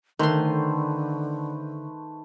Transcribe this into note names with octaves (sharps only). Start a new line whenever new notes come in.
D3 D#3 A3 B4 C5 C6